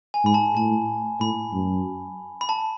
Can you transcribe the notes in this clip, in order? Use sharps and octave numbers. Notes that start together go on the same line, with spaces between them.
G#5
G#2 B5
A5
A2 A5
A2 B5
F#2
B5
A5